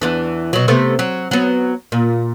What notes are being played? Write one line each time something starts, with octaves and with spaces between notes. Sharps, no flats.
E2 E3 D4
B2 F#3
C3 A3 B3
F#3
F#3 B3
A#2